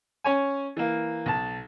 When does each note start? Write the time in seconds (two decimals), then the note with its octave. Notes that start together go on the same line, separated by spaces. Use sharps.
0.24 C#4 C#5 G#5
0.77 E3 A#3
1.26 B1 A5